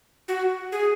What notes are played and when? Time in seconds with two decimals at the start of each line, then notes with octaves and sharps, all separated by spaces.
0.28 F#4
0.72 G#4